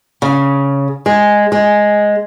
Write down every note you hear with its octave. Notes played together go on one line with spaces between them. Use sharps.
C#3
G#3
G#3